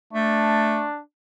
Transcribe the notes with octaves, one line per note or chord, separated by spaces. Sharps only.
A3 D4